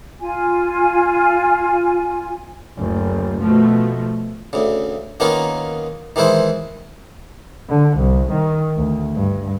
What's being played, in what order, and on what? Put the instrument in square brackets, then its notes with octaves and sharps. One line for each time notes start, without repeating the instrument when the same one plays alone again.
[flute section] F4 G#5
[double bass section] F#1 D2
B2 F3 A3
[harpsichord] D2 C#3
D#3 A#3 B3 C#4 D#4 F4
D#3 E3 G#3 E4 C5
[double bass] D3
C2
D#3
D2
G2